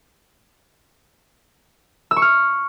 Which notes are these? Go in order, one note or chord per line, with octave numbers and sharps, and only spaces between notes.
E6
C#6
F6